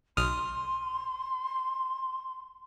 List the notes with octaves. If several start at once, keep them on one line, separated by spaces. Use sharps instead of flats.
B1 C6 D#6 F6